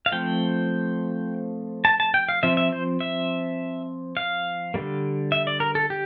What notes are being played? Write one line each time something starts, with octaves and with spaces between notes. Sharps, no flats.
F5
F3 A3 C4 G5
A5
A5
G5
F5
F3 C4 E5
E5
C5
E5
F5
D3 G3 A#3
E5
D5
A#4
A4
G4